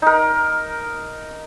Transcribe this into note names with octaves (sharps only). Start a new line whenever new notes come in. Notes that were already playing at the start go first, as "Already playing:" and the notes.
D#4 A#4